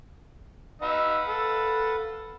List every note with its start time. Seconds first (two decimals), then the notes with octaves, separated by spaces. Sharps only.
0.82 D#4 B4 F5 F#5 E6
1.26 A4